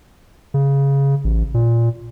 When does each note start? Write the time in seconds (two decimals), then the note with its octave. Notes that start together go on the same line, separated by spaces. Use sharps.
0.54 C#3
1.24 A1
1.54 A#2